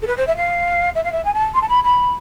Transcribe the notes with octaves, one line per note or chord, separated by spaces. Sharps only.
A4
B4
C5
E5
F5
E5
F5
E5
G#5
A5
C6
A5
B5
B5